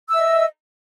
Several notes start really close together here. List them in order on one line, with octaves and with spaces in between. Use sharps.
E6 E5 D#5